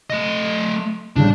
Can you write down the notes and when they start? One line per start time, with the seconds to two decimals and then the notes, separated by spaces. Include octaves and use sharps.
0.10 A3 D#5
1.16 A2 C#3 G3 D4